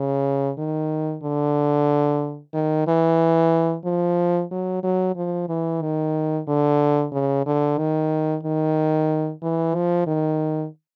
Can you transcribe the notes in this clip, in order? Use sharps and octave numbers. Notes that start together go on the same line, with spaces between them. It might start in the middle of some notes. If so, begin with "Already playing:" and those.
Already playing: C#3
D#3
D3
D#3
E3
F3
F#3
F#3
F3
E3
D#3
D3
C#3
D3
D#3
D#3
E3
F3
D#3